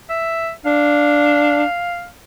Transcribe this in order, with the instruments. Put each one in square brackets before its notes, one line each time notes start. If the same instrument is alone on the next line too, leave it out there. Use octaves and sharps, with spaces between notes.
[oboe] E5
[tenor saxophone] D4 [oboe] F5